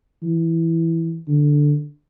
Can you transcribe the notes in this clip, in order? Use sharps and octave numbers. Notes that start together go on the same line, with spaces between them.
E3
D3